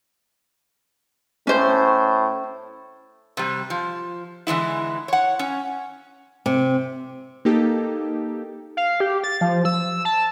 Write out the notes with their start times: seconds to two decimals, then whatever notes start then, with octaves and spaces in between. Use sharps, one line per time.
1.47 A2 C#4 C5
3.37 C3 G3
3.70 F3
4.47 D3 E3 G#3 E4
5.08 C#5 F#5
5.39 C#4
6.46 C3
7.45 A#3 D#4 G4 A4
8.77 F5
9.00 G4
9.24 A6
9.41 F3
9.65 E6
10.05 A5